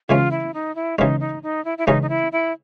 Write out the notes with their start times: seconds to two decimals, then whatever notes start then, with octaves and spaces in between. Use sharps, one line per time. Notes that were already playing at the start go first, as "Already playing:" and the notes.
0.09 C#3 E3 G#3 C#4 F4
0.31 E4
0.54 D#4
0.75 E4
0.98 C#3 E3 G#3 C#4 D#4
1.20 D#4
1.43 D#4
1.65 E4
1.78 E4
1.87 C#3 E3 G#3 C#4 D#4
2.02 D#4
2.09 E4
2.32 E4